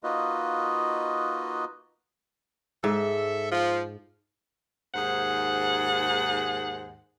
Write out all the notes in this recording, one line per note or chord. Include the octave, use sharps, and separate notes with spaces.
A#3 D#4 F4 F#4 B4 D#5
G#2 A4 E5
F3
D#2 G#2 G#4 C5 F#5